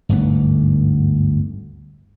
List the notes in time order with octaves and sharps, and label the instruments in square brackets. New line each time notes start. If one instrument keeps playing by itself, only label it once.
[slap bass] G1 D2 G#2 B3